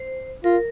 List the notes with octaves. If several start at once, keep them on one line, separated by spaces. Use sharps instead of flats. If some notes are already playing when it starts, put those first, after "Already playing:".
Already playing: C5
F4 A#4